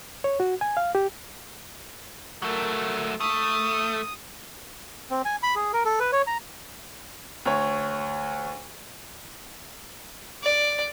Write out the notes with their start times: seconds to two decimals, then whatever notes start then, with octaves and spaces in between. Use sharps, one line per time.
0.24 C#5
0.40 F#4
0.61 G#5
0.77 F5
0.95 G4
2.42 F#3 A3 A#4
3.20 A3 D#6
5.10 C4
5.25 G#5
5.43 B5
5.56 G#4
5.73 A#4
5.85 A4
6.00 B4
6.12 C#5
6.27 A#5
7.46 D2 C#5
10.43 D5